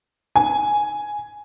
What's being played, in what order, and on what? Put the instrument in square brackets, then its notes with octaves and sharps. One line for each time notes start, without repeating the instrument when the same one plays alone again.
[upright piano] G#5